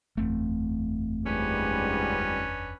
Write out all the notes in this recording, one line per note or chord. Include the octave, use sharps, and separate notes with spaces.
F#1 E2 A3 C4
C#2 G#2 G3 C#4 D4 B4